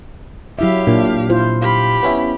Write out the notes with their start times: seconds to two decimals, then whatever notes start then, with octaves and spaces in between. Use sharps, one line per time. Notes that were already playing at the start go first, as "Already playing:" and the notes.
0.59 F#3 E4 G4 E5 F5
0.87 A#2 D4
1.30 E4 F4 C5
1.62 G4 F5 B5
2.03 B3 C#4 E4